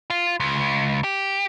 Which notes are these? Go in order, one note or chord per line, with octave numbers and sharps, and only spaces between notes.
F4
C#2
G4